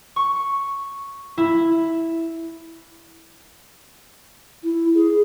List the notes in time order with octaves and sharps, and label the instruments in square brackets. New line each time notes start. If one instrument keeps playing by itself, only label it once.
[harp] C#6
E4
[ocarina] E4
G#4